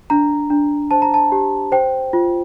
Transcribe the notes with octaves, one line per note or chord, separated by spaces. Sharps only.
D4 A#5
D4
C5 A5
A#5
A5
G4
C5 G5
F4